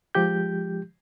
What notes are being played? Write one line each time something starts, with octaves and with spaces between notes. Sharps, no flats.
F3 G#3 G4 G6